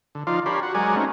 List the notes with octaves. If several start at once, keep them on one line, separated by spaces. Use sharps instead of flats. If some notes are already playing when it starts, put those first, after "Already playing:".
D3
F3 D#4 F4 D5 F5
D4 G4 A#4 C#5 B5 C6
F#4 F#5
F#3 G#3 A#4 D5 F#5 G#5
A3 A#3 C4 C#4 D#4 F#4